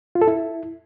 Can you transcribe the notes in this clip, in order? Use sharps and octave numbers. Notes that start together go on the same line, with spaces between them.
F4
A4
E4